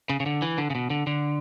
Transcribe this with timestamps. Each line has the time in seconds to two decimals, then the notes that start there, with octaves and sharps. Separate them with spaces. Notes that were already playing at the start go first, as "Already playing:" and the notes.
0.09 C#3
0.20 C#3
0.26 D3
0.42 E3
0.58 D3
0.70 C#3
0.75 B2
0.90 D3
1.07 D3